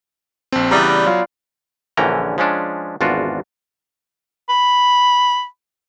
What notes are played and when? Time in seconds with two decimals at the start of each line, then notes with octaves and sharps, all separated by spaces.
0.52 A#1 C4 A5
0.71 C#3 E3 G3 B3 G4 D5 A#5
1.06 F#3 F4
1.97 A#1 D3 E3 C#4 G5 A#5
2.38 F3 G#3 C#4 D4
3.01 G#1 E2 D4 F4 F#4
4.50 B5